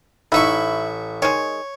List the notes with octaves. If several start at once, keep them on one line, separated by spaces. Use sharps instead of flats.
A1 D#4 E4 E5 C#6
D#3 G#3 C#5